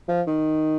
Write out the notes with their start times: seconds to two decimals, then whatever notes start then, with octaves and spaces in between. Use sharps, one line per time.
0.08 F3
0.27 D#3